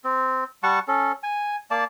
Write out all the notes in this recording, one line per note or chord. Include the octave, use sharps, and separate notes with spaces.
C4
G3 F#5 A5 C#6
C#4 A4
G#5
A#3 D5 A5